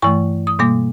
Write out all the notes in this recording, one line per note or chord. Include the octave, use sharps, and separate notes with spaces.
G2 E3 A3 C#6
D#6
B2 G3 A#3 D6